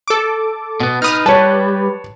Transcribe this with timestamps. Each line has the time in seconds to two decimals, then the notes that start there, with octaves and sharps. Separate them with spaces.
0.08 A4 D6
0.80 B2 B3
1.02 D#4 B4 D#6 F6
1.26 G3 B4 C#5 A5